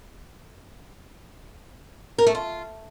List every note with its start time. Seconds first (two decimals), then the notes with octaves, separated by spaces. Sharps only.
2.18 A#4
2.27 A3
2.35 F4